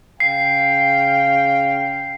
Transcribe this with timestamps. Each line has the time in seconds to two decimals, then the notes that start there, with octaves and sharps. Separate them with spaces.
0.20 C#3 F5 G5 C7